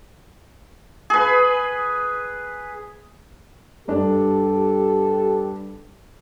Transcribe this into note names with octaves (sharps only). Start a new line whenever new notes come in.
G#4 B4
G2 D4 G4 A4